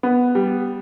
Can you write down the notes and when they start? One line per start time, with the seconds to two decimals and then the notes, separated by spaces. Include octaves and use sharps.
0.03 B3
0.35 G3